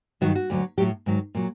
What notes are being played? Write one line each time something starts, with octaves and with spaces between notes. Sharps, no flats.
G2 D#3 F#3 F#4
F#4
D2 D3 F#3
A2 F#3 G4
G#2 D#3 F#3
A#2 F#3